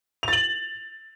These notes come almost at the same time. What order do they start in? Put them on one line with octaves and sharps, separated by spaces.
F7 A6 F#7